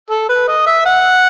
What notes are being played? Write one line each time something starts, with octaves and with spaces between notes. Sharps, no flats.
A4
B4
D#5
E5
F#5